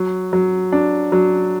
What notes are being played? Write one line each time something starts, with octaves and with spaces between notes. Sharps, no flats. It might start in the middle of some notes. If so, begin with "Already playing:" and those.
Already playing: F#3
F#3
D4
F#3